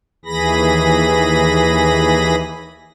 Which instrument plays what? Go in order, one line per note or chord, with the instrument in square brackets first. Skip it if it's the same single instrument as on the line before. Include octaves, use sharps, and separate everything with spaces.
[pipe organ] D#2 E3 G#4 B5 A#6